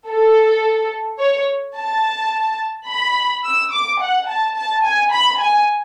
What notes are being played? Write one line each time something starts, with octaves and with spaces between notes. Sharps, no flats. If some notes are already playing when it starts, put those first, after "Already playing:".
A4
C#5
A5
B5
E6
D6
F#5
A5
A5
G#5
B5
G#5